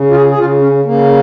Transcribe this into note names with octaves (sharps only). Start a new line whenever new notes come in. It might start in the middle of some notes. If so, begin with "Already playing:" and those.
Already playing: C#3
F4
G#4
G#4
C#3 F4
C#4
C#3 A#3